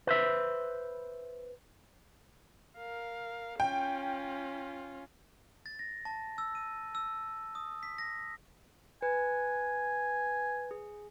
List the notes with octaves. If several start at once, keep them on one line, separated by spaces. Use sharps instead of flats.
B4 C5 E5
A#4 F5
C#4 F4 G5
A6
A#6
A5
E6
D#7
E6
D#6
B6
A#6
B4 G#5
G#4